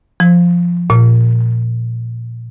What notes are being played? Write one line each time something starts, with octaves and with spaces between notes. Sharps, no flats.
F3
A#2